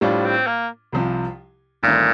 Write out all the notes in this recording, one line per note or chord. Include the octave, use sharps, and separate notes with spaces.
A2 F3 G3 D4 F4
C4
A#3
C2 C3 F3
G1 G2 A#2 D#3 A3 C4